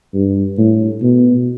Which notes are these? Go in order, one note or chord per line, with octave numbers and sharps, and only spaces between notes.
G2
A2
B2